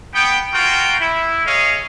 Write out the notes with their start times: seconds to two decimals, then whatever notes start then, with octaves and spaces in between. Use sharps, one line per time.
0.14 B3 G5
0.53 F4 F#4 A#4 G5
1.00 E4
1.46 G#4 C#5 D#5 F5